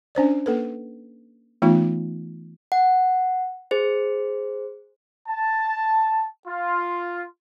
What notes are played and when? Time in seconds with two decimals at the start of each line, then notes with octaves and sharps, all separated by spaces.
0.15 C#4 D4 C5 D5
0.46 A#3 A4 B4
1.62 E3 A3 B3 D#4 F4
2.72 F#5
3.71 G#4 C5
5.28 A5
6.47 F4